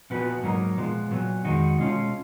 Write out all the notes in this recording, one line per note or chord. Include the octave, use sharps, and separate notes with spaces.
A#2 F3 B3 F#4 B4
G#2 F#3 A#3 D#4 A#4
A#2 F3 G#3 B3
A#2 F#3 B3
F2 D#3 G#3 D#4 F#4
B2 G#3 C#4 F4